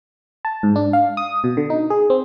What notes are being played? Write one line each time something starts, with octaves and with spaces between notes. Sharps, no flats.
A5
G#2
D4
F5
D#6
B2
D3
D#4
G#4
C4